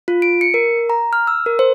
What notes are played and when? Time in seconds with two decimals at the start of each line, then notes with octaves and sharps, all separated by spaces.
0.08 F4
0.22 D7
0.41 C#7
0.54 A#4
0.90 A#5
1.13 F6
1.27 E6
1.46 A#4
1.59 C5